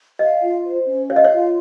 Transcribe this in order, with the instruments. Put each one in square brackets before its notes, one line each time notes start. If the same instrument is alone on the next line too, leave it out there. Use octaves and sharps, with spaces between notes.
[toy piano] D#5 [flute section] F5
[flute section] F4
C5
C#4
[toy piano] C#5 [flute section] F5
[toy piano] D#5
C#5
[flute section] F4